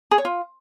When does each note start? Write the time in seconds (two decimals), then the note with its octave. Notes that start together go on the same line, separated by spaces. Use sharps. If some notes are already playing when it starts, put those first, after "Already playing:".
0.11 G#4
0.18 C#5
0.25 F4